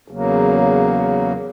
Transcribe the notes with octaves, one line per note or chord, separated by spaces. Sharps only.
E2 C#3 F#3 A#3